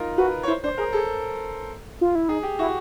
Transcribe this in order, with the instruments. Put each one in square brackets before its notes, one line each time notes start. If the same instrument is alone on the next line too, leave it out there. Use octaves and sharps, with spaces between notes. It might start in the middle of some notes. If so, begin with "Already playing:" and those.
Already playing: [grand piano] D#4 F4 A#4
[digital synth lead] F#4 [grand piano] B4
[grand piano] C#5
[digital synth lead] E4 [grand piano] C5
[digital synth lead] D4 [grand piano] C5
[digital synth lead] G#4 [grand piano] A#4
[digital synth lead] G#4 [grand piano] A4
[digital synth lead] F4
E4
[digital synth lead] D#4 [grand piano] G#4
[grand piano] G4
[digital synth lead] E4 [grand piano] F#4